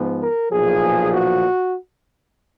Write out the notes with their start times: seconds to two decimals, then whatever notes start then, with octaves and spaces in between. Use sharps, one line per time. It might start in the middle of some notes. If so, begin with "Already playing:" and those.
Already playing: G#2 F3 B3
0.22 A#4
0.52 B1 A#2 F3 G#4
1.12 F#4